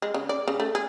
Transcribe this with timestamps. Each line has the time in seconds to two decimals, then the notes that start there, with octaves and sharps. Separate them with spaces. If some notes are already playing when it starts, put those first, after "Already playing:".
0.02 G#3
0.14 C#3
0.29 D5
0.48 C#3
0.60 A3
0.75 G#4